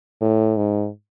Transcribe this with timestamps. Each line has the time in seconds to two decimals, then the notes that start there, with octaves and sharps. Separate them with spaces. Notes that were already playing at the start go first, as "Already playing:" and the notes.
0.21 A2
0.57 G#2